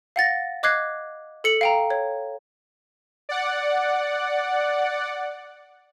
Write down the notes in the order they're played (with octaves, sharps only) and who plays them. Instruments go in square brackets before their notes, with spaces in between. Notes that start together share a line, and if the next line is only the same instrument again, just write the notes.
[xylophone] F5 F#5 A6 A#6
D#5 D6 F#6 G#6 C7
A4 C#7 F#7
F5 G5 A#5
C#5
[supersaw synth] D5 F#5